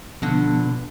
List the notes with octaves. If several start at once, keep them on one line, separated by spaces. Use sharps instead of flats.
G2 B2 D3 F3 B3